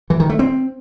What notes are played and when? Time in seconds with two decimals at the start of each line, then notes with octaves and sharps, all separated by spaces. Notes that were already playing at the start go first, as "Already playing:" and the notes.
0.10 E3
0.20 D#3
0.29 A3
0.39 C4